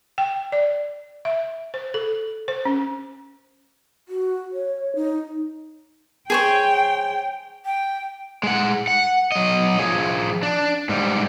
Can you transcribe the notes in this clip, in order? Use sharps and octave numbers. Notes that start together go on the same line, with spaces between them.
G5
D5
E5
C5
A4
C5
C#4
F#4
C#5
D#4
G#4 C5 C#5 G5
G5
G#3 F#5
F#5
F#3 D#5
F3 G#4
D4
G#2 G3